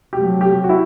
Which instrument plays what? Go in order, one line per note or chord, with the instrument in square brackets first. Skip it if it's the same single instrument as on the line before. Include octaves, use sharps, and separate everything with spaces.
[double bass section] C3 F#3 A3 [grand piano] G4
[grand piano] G4
F#4
E4